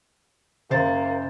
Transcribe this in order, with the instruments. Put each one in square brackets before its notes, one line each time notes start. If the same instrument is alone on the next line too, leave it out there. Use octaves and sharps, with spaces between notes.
[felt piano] F#1 C5 A6 [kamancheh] A#3